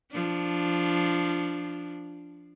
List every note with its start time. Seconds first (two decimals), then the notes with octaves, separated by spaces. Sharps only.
0.12 F3 D4